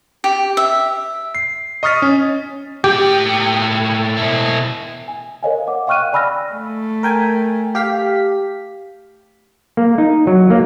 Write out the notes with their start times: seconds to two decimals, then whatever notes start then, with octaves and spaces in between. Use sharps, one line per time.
0.24 G4
0.57 E5
1.35 C7
1.83 D#5 C#6 D#6 F6 A6 B6
2.02 C#4
2.84 A2 G4 G5
4.17 B2 E4
5.08 G#5
5.43 A#4 C5 C#5 D#5 F5 G#5
5.67 D#5 F#5 D6
5.87 F5 G5 C#6 F6 F#6 D#7
6.13 D5 G#5 B5 E6 F6 A#6
6.52 A3
7.03 A#4 G5 G#5
7.75 G4 F5 B6
9.77 A#3
9.98 D#4
10.27 F#3
10.50 A#3